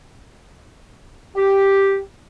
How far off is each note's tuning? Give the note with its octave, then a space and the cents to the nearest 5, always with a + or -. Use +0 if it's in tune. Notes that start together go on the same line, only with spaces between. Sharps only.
G4 +0